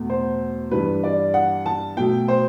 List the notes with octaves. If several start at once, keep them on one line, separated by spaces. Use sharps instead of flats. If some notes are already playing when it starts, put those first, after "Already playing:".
Already playing: E2 B2 A3
C5
G2 E3 G3 B4
D5
F#5
A5
B2 F#3 A3 G5
C5